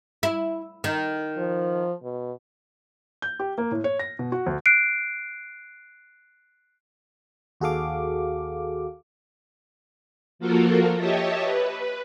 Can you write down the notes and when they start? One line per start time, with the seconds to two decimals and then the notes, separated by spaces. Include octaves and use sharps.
0.23 E4
0.84 D#3
1.37 F3
2.03 B2
3.22 G6
3.39 G4
3.58 A#3
3.71 A2
3.84 C#5
3.99 A#6
4.19 B2
4.32 F#4
4.46 D2
4.66 F#6 C7 D7
7.60 D#2 F#4 G#4 A4 F5 D6
10.39 F3 A#3 F4 F#4 A4 A#4
10.97 G4 C#5 D#5 E5 A5
11.43 B4